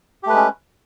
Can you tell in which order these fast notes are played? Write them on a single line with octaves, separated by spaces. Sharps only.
G4 A3 B4 G#3 C#4